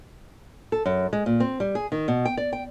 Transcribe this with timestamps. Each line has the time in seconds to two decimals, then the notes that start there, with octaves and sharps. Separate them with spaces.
0.72 A4
0.86 F#2
1.13 G#3
1.26 A#2
1.40 C4
1.60 G3
1.75 G#4
1.92 D#3
2.08 B2
2.25 G5
2.37 D5
2.53 G5